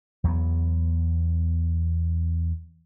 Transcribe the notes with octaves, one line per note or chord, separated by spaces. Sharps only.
E2 F#3 A#3 B3